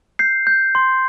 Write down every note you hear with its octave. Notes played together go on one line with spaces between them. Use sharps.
G6 C7
G6
C6